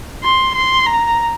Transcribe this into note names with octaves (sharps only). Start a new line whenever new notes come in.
C6
C6
A#5